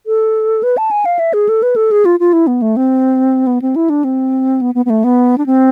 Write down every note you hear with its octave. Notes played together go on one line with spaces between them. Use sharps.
A4
B4
A5
G#5
F5
E5
G#4
A4
B4
A4
G#4
F4
F4
E4
B3
A3
C4
B3
C4
E4
D4
C4
B3
B3
B3
A3
B3
D4
C4